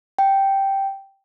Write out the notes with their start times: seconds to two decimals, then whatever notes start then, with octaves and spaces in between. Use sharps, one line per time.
0.19 G5